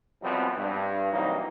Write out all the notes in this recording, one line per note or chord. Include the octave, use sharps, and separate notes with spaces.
F#2 B2 F3 G3 B3 C4
G2
C3 E3 F#3 G3 A#3 D#4